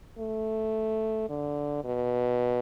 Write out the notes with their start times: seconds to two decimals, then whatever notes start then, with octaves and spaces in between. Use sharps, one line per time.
0.19 A3
1.29 D3
1.85 B2